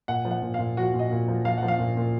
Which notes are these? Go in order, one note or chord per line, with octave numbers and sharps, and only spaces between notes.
A#2 F#5
F3
F#5
A#2
A#2 F5
F3 F#4
A#2
D#5
A#2
F3
F3 F5
F3 F#5
F5
A#2
A#2